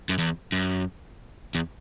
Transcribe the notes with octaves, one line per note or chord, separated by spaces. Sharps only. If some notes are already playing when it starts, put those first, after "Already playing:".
F#2
E2
F#2
E2